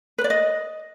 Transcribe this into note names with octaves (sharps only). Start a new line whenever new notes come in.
B4
D5
D#5